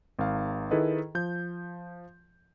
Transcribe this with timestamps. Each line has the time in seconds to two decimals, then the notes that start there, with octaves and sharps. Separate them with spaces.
0.19 G#1 F5
0.71 D#3 E4 G#4 A4 B4 D#5
1.15 F3 G6